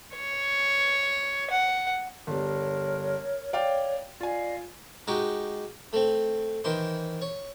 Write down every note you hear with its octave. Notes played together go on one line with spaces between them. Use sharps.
C#5
F#5
G1 G3 A#4 C#5
C#5 D5 F5 G5
F4 D5 D#5 F5 G#5
G#3 D#4 F#4 G4
A3 C4
D#3 E3 C5
C#5